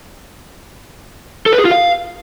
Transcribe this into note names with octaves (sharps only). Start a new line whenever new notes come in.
A4
B4
G#4
F4
F5